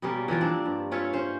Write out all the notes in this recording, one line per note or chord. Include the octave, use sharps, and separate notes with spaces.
B2 G3 A#3 C#4
E3 F3 F4 A#4
C4 D4
G2
C#4 F4 C#5 E5
C#4 C5